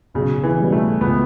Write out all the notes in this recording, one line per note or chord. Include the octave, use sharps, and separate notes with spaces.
B1 C#3
E3
B2 G3 C#4
A3
C#2 B3